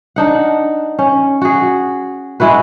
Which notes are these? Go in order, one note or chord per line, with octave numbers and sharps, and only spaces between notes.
D4 D#4 F#5
C#4
F#4 G#4
G#3 E4 F#4 B4